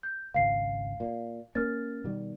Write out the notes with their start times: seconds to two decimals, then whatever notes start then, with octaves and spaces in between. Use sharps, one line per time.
0.03 G6
0.34 G#1 C#2 F5 C7
1.00 A#2
1.55 A#3 C#4 A#4 F6 A6
2.04 B2 D#3 G3